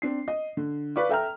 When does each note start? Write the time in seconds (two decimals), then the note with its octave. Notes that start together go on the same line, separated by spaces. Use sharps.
0.02 C4 D4 C7
0.28 D#5
0.57 D3
0.96 B4 D5 F5 C#6 D6
1.09 A4 E5 G5 A#5 F6